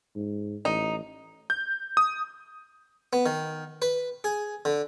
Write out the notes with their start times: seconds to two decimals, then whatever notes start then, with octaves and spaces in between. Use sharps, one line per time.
0.16 G#2
0.65 A1 D#4
1.50 G6
1.97 D#6
3.13 B3
3.26 D#3
3.82 B4
4.24 G#4
4.65 D3